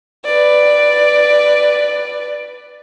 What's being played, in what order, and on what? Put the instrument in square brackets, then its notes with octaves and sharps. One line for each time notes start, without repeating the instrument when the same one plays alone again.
[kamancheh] B4 D5